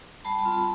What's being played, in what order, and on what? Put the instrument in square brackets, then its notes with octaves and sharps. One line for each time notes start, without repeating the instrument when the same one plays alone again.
[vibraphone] G3 A5 B5
A5 B5
C4 F4
A5 B5